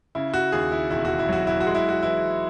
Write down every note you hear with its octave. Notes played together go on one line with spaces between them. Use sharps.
C#3 E4
F#4
D#2 G#4
E4
E1 E4
F#4
E4
F#3 F#4
E4
F#4
G#3
E4
F#4
E3 E4